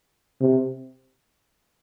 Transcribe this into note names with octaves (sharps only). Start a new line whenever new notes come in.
C3